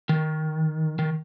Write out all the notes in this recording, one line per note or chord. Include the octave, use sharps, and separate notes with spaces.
D#3
D#3